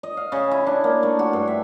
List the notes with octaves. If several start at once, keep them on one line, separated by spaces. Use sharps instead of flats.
D#5
F5
C#3
E4
D4
A#3
A3
F#4
G2
E5